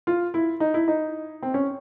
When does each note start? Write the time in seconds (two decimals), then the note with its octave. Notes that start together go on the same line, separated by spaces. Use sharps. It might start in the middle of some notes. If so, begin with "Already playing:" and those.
0.07 F4
0.34 E4
0.60 D#4
0.74 E4
0.88 D#4
1.42 C4
1.54 C#4